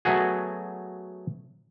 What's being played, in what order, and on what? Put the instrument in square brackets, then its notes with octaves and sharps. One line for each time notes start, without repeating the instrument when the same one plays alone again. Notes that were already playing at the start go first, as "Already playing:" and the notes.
[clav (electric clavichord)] F#3 A3 B3 F#4 G#4